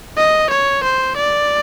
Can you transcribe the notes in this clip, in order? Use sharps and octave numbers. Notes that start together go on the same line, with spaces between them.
D#5
C#5
C5
D5